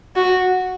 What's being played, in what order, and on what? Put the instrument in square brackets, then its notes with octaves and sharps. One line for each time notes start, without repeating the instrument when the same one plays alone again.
[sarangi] F#4